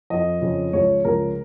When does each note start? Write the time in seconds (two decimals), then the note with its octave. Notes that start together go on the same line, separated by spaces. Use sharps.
0.10 F2 F3 D#5
0.41 F2 C#3 F3
0.73 C#2 C#3 F3 C#5
1.05 C#2 C#3 F3 A#4